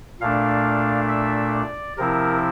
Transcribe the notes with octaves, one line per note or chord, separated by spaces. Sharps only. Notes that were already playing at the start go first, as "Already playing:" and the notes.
A#2 A3 D4 F5
E5
D5
C3 F3 C4 E4 A#4